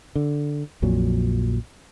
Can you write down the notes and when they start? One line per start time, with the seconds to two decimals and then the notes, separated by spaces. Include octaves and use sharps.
0.15 D3
0.82 A#1 F2 A#2 F#3